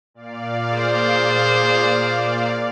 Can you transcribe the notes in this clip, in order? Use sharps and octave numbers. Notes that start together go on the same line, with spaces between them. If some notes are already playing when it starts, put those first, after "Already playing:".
A#2 D5 F5
G#4 C5